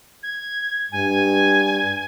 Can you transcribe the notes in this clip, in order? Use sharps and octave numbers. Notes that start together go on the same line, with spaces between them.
G#6
G2 G#5